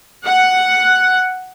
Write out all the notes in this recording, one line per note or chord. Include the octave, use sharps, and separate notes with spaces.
F#5